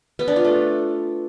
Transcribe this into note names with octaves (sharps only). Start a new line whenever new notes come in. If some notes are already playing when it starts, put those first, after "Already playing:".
B3
D4
F4
A3